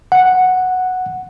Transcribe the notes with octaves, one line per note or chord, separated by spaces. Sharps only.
F#5